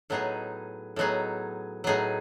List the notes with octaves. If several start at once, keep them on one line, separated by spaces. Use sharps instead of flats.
A2 F#3 B3 D#4 G#4
A2 F#3 B3 D#4 G#4
A2 F#3 B3 D#4 G#4